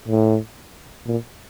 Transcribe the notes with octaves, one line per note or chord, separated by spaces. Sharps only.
A2
A#2